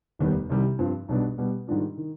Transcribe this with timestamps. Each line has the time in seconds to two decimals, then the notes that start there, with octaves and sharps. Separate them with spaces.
0.19 F1 D#2 D#3 G3 B3
0.50 C2 C3 D#3 G3
0.79 G2 F3 C4 F4
1.09 B1 B2 G3 B3 D4
1.38 B2 G3 B3
1.67 G#2 D#3 G3 D4 F4
1.98 D#3